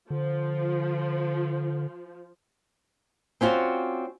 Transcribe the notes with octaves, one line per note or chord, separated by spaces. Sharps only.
D3 F3
C4 C#4 F4 F#4 D5